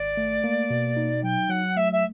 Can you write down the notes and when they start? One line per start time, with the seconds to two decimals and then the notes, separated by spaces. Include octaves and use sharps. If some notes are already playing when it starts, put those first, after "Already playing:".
Already playing: G#1 D5
0.17 A3
0.44 A#3
0.70 B2
0.97 D#4
1.23 F#3 G5
1.49 F#3 F#5
1.76 A3 E5
1.92 E5